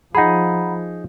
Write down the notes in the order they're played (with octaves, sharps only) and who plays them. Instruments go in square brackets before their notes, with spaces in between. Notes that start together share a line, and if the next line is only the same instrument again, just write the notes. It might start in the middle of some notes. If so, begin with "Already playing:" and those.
[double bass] F3 [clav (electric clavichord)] D#4 G#4 [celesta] F#5 A#5 B5